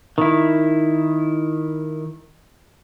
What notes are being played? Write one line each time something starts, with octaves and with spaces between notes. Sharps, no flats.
D#3 E4